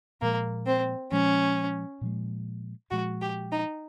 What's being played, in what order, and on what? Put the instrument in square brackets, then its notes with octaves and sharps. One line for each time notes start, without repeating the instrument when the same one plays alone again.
[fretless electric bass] A#2 F3 G#3 [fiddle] A#3
[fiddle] C4
[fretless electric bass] A#2 F3 G#3 [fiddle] C#4
[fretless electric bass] A#2 F3 G#3
[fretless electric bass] A#2 F3 G#3 [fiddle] F#4
[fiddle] G4
D#4